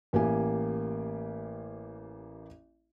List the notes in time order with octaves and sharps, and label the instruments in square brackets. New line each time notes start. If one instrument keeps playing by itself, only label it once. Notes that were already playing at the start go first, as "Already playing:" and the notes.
[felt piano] A1 A#3 G4 G#5